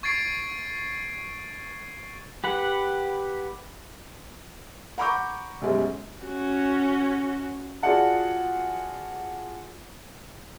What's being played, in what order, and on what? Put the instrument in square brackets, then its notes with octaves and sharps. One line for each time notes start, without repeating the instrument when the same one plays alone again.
[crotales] C#6 G#6 A6 C7 D7
[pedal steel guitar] G4 B4 F#5
[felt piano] F#5 A#5 B5 C#6 D6 G6
B1 F#2 B2 G3 G#3
[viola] C#4 F#4
[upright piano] F4 F#4 G#4 D5 F#5 A5